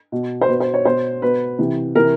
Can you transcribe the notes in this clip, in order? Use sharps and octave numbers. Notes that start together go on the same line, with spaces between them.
B2
C5
B2 B4
C5
C#5
B2 C5
B2 B4
C3 E3
C3 E3 A#4